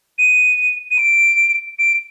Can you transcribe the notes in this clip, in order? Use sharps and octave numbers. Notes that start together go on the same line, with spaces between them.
D#7
D#7
D7
D7